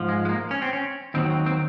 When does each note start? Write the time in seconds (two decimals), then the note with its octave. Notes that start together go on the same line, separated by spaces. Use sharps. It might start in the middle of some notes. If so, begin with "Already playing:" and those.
Already playing: G#2 F3
0.09 G#3
0.25 G#3
0.29 A#3
0.51 C#4
0.62 C4
0.73 C#4
1.14 D#2 D#3 F#3 C4
1.30 C4
1.46 C4